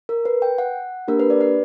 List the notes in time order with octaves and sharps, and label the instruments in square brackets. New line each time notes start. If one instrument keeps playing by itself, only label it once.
[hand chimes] A#4
B4
G5
F#5
A#3 D4 G4 A#4
B4
D5
B4